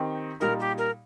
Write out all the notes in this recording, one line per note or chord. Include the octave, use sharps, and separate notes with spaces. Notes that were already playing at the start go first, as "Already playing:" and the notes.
Already playing: D#3 C4 D#4 G4
A#2 G3 D#4 A#4
G4
A#4